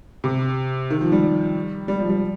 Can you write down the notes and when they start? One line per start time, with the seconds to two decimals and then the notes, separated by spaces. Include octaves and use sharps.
0.24 C3
0.90 D#3
1.01 F3
1.12 G3
1.88 G3
1.99 F3
2.09 G3